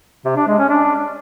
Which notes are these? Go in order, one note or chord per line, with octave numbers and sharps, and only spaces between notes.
C3
D4
G#3
C#4
D4